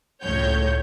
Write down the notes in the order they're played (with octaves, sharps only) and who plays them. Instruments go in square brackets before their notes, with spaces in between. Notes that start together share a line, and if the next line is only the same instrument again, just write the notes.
[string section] C#2 A2 C#5 G6